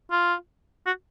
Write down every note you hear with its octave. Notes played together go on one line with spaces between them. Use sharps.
F4
F#4